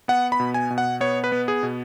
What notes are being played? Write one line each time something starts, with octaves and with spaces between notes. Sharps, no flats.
B3 F#5
B5
B2
G#5
B2
F#5
B3 C#5
B4
B3
G#4
B2